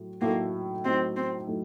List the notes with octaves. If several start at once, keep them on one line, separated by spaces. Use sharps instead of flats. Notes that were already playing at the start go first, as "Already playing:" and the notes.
Already playing: A2 F#3 A3
A2 F#3 A3 A#3 D#4 A4
A2 F#3 A3 C4 D#4 A4
C4
A2 F#3 A3 D#4 A4